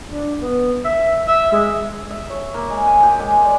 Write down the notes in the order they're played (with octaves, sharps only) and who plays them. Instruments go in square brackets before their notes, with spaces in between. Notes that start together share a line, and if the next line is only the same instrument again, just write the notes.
[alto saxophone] D4
B3
E5
E5
G#3
[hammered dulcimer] E5
C#5
A#3
G#3
G#5
G4
G#3
D5